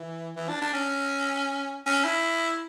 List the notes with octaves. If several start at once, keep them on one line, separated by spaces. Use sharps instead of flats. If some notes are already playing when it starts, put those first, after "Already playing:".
Already playing: E3
E3
D4
D4
C#4
C#4
E4